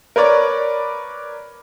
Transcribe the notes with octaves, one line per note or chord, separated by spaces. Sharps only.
A#4 B4 C#5 D5